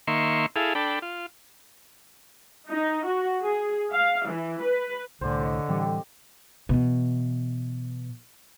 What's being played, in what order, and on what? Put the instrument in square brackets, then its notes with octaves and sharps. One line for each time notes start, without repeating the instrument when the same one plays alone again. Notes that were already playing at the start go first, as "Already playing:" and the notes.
[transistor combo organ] D#3 A#3 E5 C6 C#6
E4 G#4 A4 F5
D4 A4 G5 B5
F4
[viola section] D#4
F#4
G#4
F5
E3
B4
[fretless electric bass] C2 A2 [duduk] D3 [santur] C5 D5 G#5
[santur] C#5 D#5 E5
[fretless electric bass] A2 E3 G3 [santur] C4 G4 A4
[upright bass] B2 E3